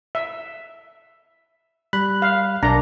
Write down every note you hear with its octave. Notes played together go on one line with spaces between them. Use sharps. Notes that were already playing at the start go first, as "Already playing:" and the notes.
E5
G3 B5 F#6
F5
B1 D4 A#4 A#5